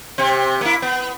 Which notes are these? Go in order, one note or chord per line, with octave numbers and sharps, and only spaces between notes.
C3 C4
A#3 E4
B3